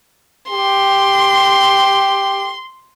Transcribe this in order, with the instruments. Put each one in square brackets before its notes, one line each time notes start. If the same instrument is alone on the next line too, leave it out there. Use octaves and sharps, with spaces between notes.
[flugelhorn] G4 [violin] C6